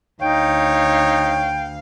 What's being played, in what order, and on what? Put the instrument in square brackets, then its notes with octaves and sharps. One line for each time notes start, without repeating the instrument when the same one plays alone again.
[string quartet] D2 F5 [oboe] D#4 [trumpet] C#5 [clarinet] G5